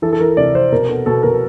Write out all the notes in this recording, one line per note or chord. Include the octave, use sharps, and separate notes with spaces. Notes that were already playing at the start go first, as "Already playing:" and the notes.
E3 A4
A4
E3 A#4
C3 D5
C4 C5
B2 A#4
B3 A4
B2 A4
B2 A#4